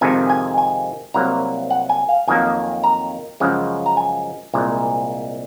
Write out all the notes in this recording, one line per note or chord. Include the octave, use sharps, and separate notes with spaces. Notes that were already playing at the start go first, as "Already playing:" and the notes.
F2 C3 D#3 G#3 G#5
G#5
G#5
C2 C3 F#3 A#3 A#5
F#5
G#5
F5
F2 D#3 F#3 A#3 G#5
A#5
F#2 C#3 F3 G#3
A#5
G#5
C2 A#2 G#3